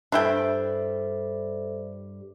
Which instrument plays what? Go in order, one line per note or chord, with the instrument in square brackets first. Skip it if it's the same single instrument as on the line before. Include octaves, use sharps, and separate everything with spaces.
[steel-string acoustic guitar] G2 G3 [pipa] D4 E4 G5 [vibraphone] A4 C5 E5